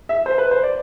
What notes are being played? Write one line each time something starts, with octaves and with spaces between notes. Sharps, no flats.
E5
C5
B4
C5
D5